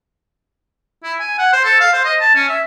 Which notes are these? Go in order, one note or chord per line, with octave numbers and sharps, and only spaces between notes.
E4
G#5
F#5
C5
A4
F5
C5
D#5
A5
C#4
E5